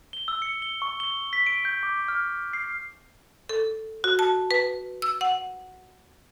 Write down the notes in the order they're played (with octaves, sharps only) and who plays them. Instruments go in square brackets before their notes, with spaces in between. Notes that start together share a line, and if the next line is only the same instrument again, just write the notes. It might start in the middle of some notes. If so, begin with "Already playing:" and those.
[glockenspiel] G7
E6
C#7
G7
C#6
G7
B6
D7
G6
D6
F6
C7
[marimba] A4
F#4
A5
B4
E6
F#5